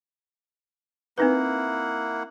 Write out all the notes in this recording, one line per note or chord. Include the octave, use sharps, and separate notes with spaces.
A#3 C4 D#4 E4 B4 F#5